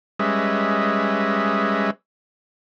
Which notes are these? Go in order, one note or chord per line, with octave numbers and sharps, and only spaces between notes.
G3 G#3 C#4 B4 D#5 E5